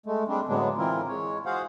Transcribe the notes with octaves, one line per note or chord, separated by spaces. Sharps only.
G#3 A3
G3 G#3 C4 D4
A2 D3 F#3 G#3 B3 D4
E3 C4 E4 F4 A#4
G#3 C#5
F#4 G#4 C5 F5 F#5